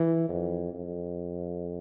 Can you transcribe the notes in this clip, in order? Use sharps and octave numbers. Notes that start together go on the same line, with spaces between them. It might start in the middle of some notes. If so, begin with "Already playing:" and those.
Already playing: E3
F2
F2